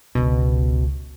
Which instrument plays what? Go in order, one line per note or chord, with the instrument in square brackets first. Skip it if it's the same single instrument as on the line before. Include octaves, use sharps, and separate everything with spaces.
[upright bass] G1 C#2 [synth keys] B2